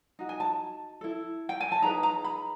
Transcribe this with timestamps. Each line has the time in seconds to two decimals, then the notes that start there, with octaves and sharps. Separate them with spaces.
0.19 D#4 F#4
0.29 G#5
0.40 A5
1.01 E4 A4
1.49 G5
1.61 G#5
1.72 A5
1.82 D#4 G#4 B4 A#5
2.03 A#5
2.24 B5